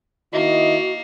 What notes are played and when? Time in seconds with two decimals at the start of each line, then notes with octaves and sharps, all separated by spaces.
0.33 D#3 A#3 E4 F#4 D#5